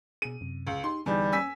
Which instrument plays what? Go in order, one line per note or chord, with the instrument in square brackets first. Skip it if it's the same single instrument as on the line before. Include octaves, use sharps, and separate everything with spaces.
[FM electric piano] B2 G#4 [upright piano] D#7
[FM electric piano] F#2 C3
[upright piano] C#2
[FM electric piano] D#4 G4 [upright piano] C6
[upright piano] E2 [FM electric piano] D3 E3 D#4 [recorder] G3
[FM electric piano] C#4 [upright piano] G#5 E6 B6